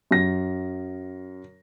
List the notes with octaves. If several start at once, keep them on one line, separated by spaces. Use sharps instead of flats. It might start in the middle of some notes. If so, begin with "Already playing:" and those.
F#2 A#6